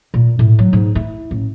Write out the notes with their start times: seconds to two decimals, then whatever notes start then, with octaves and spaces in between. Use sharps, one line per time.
0.14 A#2
0.39 A2
0.59 F#3
0.73 G#2
0.95 E4
1.31 A1